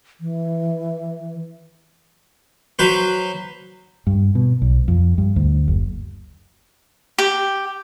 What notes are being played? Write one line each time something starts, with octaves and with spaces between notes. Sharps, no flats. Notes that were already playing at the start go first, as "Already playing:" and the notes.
E3
F#3 B4 C5
G2
B2
B1
F2
G2
D2
F#1
G4